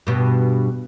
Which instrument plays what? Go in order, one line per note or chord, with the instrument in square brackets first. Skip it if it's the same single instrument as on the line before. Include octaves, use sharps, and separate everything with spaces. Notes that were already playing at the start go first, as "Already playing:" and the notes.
[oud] G2 B2